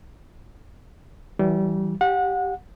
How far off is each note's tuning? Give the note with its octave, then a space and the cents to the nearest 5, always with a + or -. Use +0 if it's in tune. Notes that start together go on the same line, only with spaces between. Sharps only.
E3 +0 G3 -30
G4 +0 F#5 -30